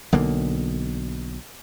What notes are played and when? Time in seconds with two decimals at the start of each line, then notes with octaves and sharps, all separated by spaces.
0.12 B1 D3 A#3